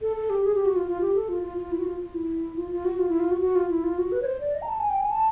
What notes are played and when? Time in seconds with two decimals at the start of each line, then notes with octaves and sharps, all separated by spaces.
0.01 A4
0.16 A4
0.30 G4
0.44 G#4
0.55 G4
0.65 F#4
0.76 F4
0.87 F4
1.01 G4
1.15 A4
1.29 F4
1.43 F4
1.58 F4
1.71 E4
1.79 F#4
1.86 F4
2.00 F4
2.14 E4
2.56 F4
2.71 F4
2.85 F#4
2.99 F4
3.09 E4
3.20 F4
3.31 F#4
3.41 F#4
3.56 F4
3.70 E4
3.84 F4
3.98 F#4
4.12 B4
4.22 C#5
4.26 C5
4.40 D5
4.55 D#5
4.62 A#5
4.69 A5
4.79 G#5
4.90 G5
5.01 G#5
5.11 A5